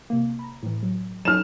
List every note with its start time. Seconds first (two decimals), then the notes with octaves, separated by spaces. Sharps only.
0.10 C3 A#3
0.39 A#5 B5
0.63 A2 E3
0.83 F#3
1.25 F#3 C#4 D#4 F6 E7